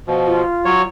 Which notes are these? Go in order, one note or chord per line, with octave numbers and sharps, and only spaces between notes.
B2 F3
F4
F#3 C#5